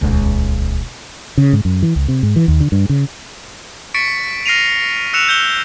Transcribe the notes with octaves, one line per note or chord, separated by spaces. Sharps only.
D#1 C#2
C#3
G#2
F#2
E3
C#2
C3
G#2
E3
D#2
D3
G2
C#3
C#6 A6 B6 C#7 D7
F6 A#6 C7 D7 D#7 F7
E6 F#6 C#7 E7 F7
E6 G6 G7